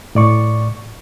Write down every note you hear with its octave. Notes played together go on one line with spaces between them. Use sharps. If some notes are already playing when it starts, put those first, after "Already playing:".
A2 D5 C#6